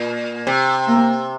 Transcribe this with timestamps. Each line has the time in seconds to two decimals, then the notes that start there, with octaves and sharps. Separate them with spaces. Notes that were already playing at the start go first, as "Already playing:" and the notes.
Already playing: A#2
0.47 C3
0.88 A#3